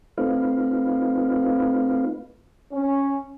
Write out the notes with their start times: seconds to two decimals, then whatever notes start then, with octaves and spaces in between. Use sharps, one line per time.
0.18 A3 C4 D#4 F4 B4 F5
2.72 C#4